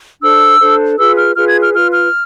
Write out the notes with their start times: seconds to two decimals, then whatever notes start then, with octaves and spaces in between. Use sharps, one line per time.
0.22 D4 A4 C5 E6
0.60 D4 A4 C5
0.98 F4 G#4 B4 E6
1.17 F6
1.35 F4 G#4 B4 F6
1.48 G#6
1.61 F6
1.73 F4 B4 F6
1.92 F6